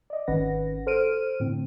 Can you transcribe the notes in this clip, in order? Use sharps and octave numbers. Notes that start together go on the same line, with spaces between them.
D5 D#5
G#1 D#3 C#4 B4 F#5 A#6
A4 C5 F6 D7 D#7
A2 D3 C4